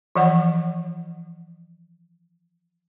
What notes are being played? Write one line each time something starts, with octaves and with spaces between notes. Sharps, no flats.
E3 F3 C#5 F#5